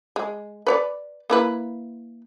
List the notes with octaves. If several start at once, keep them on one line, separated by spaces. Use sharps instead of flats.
G#3
B4 C#5 D5
A#3 E4 B4